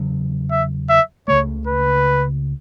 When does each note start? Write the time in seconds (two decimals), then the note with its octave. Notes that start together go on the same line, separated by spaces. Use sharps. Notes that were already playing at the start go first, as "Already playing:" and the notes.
Already playing: E2 C#3 F#3
0.51 E5
0.90 E5
1.28 C#2 C#3 A3 C#5
1.67 B4